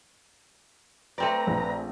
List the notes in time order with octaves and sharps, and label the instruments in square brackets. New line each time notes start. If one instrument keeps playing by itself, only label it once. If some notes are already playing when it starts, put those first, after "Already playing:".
[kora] A3 C4 D5 [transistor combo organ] B4 A#5
[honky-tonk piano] A#1